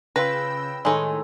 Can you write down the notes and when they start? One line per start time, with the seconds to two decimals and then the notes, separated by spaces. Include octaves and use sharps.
0.16 C#3 F4 B4 G5 E6 A#6
0.85 A2 D#3 G#3 D#4 A4 C#5 G#5 C6